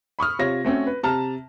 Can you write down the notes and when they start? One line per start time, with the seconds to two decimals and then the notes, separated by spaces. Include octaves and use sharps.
0.19 B5 C#6 D#6 F6
0.39 C3 F4 C#5 A#6
0.65 A3 C4 C#4 F#4
0.87 B4
1.03 C3 A5 A#5 F6